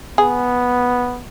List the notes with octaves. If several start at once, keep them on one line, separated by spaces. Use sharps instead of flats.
B3 G#4